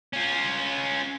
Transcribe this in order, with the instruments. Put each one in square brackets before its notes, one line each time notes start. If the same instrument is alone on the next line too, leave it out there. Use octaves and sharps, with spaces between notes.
[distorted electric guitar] C#4 F4